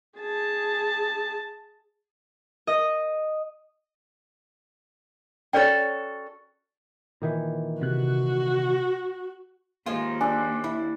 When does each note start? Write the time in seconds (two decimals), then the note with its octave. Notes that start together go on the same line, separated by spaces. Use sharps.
0.18 G#4 A5
2.67 D#5
5.53 C#4 F#4 A4 C#5 D5 G5
7.22 A#2 D#3 E3
7.81 C3 F#4 F#6
9.86 D#2 F3 G#3 F4
10.21 D4 G#5 E6
10.64 E4